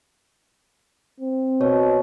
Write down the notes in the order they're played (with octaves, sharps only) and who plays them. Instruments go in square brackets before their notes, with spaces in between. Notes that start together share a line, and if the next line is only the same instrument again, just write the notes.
[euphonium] C4
[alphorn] B2 [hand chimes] C#5